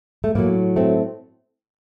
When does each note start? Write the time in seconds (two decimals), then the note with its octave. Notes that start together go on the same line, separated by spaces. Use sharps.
0.24 A3
0.35 A2 F#3 A#3
0.76 A3 C4